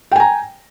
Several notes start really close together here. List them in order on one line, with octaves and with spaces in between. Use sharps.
G5 G#5 A#5